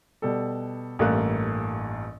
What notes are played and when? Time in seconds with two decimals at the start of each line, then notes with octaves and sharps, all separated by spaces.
0.22 B2 G3 A4
0.99 A1 G2 A3 A#3 F5 F#6